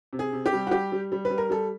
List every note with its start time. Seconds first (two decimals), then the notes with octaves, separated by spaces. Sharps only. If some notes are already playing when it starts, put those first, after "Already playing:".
0.13 C3
0.19 G#4
0.33 C3
0.46 G4
0.53 G3
0.67 F#4
0.71 G3 G4
0.92 G3
1.12 G3
1.25 B4
1.30 G3
1.38 A#4
1.50 G3 A4